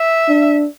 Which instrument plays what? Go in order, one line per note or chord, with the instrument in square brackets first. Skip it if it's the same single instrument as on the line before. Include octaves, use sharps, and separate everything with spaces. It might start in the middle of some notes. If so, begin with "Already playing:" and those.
Already playing: [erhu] E5
[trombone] D4